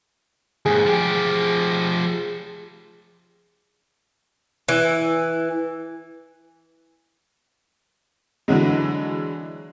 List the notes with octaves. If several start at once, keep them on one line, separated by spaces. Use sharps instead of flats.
D#2 G#2 G#4
F3 G4
E3
D3 E3 F#3 G#3